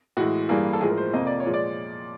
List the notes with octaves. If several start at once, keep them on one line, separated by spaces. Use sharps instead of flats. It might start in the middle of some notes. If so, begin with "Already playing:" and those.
A2 E3 G#3 F#4
G2 E3 G3 A#3 G#4
A4
A2 F3 G#3 G#4
A#4
C5
F2 C3 F3 A#3 D#5
D5
C#5
A#2 F3 G#3
D5